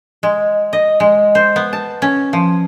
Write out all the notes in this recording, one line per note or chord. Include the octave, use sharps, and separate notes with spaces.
G#3
D#5
G#3
C5
B3
A5
C#4
F3